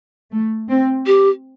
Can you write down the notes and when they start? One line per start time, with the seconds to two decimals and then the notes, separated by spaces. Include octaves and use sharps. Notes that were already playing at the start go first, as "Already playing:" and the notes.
0.31 A3
0.68 C4
1.06 G4